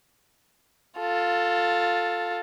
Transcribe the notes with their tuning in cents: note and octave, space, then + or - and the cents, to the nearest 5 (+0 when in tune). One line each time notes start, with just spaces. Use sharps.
F4 +10 A4 +10